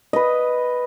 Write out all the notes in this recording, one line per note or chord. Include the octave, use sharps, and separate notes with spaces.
B4 D#5